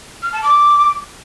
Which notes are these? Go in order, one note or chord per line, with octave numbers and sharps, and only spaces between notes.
F6
A5
D6